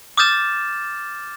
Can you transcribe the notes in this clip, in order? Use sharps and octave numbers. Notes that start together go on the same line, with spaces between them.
D6 D#6 F6 G6 A6 E7